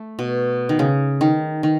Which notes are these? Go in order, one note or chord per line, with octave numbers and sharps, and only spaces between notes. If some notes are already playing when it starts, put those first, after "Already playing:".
Already playing: A3
B2
D#3
C#3
D#3
D#3